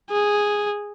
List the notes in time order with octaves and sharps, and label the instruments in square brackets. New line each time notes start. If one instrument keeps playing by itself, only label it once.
[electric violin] G#4